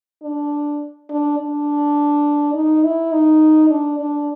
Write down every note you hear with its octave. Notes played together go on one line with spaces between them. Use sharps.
D4
D4
D4
D#4
E4
D#4
D4
D4